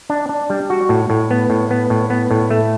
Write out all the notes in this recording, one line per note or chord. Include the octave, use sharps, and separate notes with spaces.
D4
D4
G3
F#4
A2
A2
B3
A2
B3
A2
B3
A2
A3